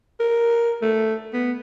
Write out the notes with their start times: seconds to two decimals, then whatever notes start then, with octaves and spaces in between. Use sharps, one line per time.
0.20 A#4
0.82 A3
1.33 B3